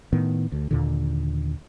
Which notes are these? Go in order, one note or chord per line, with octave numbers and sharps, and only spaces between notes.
A2 D#3 B3
D2
D#2 A#2 D3